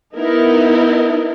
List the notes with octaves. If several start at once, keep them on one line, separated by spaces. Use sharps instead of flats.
B3 D#4 E4 A#4